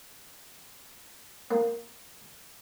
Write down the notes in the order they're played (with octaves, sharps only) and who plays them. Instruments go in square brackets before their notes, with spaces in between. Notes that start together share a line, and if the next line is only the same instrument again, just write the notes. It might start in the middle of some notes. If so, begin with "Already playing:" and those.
[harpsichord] A#3